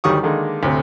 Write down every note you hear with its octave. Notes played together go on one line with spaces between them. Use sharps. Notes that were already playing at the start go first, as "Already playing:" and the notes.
D2 D#3 F#3 G3 C#6 D#6
D3 D#3 G#3 A#3
D2 A2 C3